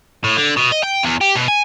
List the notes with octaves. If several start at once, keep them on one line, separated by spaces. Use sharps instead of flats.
A2
D3
B2
D#5
G5
E2
G4
B2
G#5